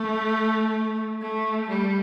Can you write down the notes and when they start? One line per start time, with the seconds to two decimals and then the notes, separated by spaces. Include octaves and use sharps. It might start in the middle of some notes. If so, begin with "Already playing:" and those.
Already playing: A3
1.22 A3
1.69 G3